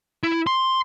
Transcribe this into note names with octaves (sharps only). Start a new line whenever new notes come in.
E4
C6